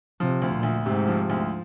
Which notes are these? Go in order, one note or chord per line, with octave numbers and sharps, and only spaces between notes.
C3 F3
D2
A#2
D2
G#2 C3
F3
D2